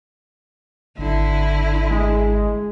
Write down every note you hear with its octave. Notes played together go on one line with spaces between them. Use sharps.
G#1 D3 E4
G#3